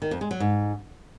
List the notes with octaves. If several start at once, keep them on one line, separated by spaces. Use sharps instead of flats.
D#3
F2
G#3
F#3
G#2